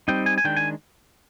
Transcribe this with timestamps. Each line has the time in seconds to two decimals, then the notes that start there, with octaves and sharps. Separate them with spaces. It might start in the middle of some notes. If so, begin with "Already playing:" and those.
0.08 G3 C4 D#4 G5
0.26 G#5
0.38 G#5
0.44 D#3 G#3 D4 G5
0.57 G#5